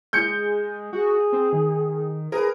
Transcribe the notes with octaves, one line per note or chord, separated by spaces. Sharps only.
G#3 G6 C#7
F#4 G#4
C4
D#3
G#4 A#4 B4